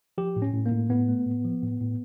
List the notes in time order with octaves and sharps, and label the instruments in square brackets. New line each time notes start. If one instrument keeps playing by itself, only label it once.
[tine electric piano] F3 G4
A2
C#4
A2
A#3
A2
A2 B3
A3
A2
F3
A2
A2